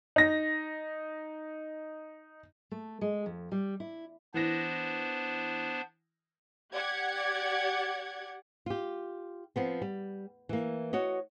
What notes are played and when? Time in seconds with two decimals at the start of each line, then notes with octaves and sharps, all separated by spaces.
0.16 D#4 A#6
2.71 A3
3.01 G#3
3.26 F2
3.52 G3
3.80 E4
4.34 E3 B3 D4 C5 A#6
6.73 G4 D5 F#5 G#6
8.66 F4 G4
9.56 F3 B3 C4
9.82 G3
10.49 E3 A#3
10.93 F#4 C#5 D#5